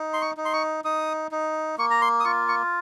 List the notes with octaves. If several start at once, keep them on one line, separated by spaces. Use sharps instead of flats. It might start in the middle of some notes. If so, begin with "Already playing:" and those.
Already playing: D#4
C6
C#6
D#4
C6
C#6
D#4 D#6
D#4
A#3 C#6
A#5
C6
D#6
F4 C#6
C#6